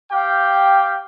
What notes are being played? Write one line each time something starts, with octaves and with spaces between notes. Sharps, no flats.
G4 F5 G5